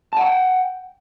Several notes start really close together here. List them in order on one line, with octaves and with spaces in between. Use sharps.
A5 F#5 A#5 G5